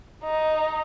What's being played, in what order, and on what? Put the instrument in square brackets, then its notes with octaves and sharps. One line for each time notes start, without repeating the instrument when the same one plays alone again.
[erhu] D#4